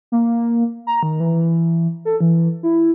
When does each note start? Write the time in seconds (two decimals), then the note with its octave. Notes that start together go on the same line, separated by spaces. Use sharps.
0.12 A#3
0.87 A#5
1.03 D#3
1.20 E3
2.05 A4
2.21 E3
2.63 E4